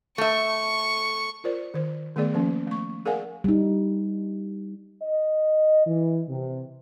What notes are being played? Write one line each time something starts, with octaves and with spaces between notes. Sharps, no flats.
A3 E5 C#6
F4 A#4 C5 D5
D#3 C5
D#3 A3 B3 G#4 D5
F3 A#3 C#4
A3 C#6
G#4 A#4 D5 F5 F#5 G#5
G3 D#4
D#5
E3
C3